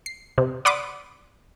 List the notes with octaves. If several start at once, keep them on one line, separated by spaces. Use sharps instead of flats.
C7
C3
D5 F#5 B5 C6 D6 D#6